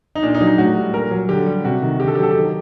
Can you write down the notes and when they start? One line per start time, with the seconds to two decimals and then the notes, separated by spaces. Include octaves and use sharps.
0.15 D#4
0.23 A#2 D4
0.34 D#4
0.40 F#3
0.47 D#4
0.58 A2 F#4
0.76 G3
0.94 A#2 A#4
1.11 F#3
1.29 D3 G4
1.46 G3
1.64 C3 F#4
1.82 D#3
2.00 D3 G4
2.07 A4
2.15 F#3 G4
2.23 A4
2.31 D#3 G4